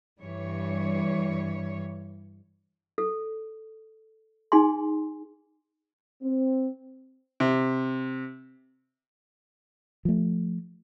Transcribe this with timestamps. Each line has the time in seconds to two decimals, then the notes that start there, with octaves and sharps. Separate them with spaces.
0.19 G2 E3 G3 C#5
2.98 A4
4.52 D#4 G#4 G#5 C6
6.23 C4
7.40 C3
10.05 F3 A3